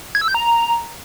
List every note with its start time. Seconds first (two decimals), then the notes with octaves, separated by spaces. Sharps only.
0.15 G#6
0.21 E6
0.28 G6
0.34 A#5